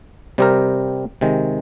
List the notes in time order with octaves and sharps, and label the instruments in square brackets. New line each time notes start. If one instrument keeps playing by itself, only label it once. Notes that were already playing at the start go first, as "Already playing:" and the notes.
[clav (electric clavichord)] C3 G3 C4 G4 A#4
C3 D#3 G#3